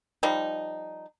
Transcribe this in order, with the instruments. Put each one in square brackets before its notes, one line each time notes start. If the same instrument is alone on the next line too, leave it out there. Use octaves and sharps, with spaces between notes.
[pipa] F3 G3 D#4